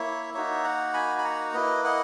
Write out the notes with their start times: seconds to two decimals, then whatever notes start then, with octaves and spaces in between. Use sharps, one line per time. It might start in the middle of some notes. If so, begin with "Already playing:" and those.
Already playing: A#3 E4 C#5 E5
0.34 A#3 D#4 F#4 C#5 E5
0.64 F#5 A#5
0.94 G#5 B5
1.18 B5
1.24 F#5 A#5
1.54 A#3 E4 B4 D#5
1.85 D#5 F#5